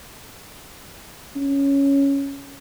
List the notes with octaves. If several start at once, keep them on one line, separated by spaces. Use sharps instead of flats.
C#4